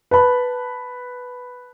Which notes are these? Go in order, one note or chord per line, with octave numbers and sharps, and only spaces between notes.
B4 A5 B5